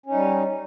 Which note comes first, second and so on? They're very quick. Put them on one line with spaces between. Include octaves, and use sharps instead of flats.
C#4 D#4 G3